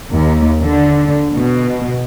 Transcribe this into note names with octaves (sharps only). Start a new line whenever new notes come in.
D#2
D3
B2